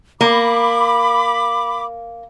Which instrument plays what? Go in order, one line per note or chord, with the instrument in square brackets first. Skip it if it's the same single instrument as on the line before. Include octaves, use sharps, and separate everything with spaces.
[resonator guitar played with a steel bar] A#3 [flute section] B5 D6